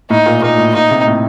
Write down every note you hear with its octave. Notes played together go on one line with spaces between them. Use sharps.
A2 D#4
A#2
A#2 D#4
A2
A#2 D#4
C3
A2